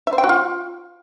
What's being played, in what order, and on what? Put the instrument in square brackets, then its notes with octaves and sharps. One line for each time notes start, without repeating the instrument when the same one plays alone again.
[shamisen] E5
C5
G5
F#4
F4